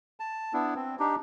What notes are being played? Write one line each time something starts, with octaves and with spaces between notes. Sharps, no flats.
A5
B3 D4 E4
C4
D4 D#4 G4